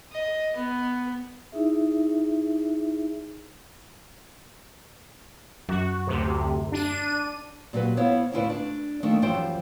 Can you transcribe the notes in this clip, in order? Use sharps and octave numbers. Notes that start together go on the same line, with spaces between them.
D#5
B3
D#4 E4 G#4 E5
F#2 F#4
D2 C3
D4 D#7
A#2 F#3 G4 B4
B3 E4 C5 C#5 F5
D2 A2 E4 F4 B4 D5
D4
D#3 F3 A3 A#3 D4 D#4
F#2 E3 F3 G3 C5 G5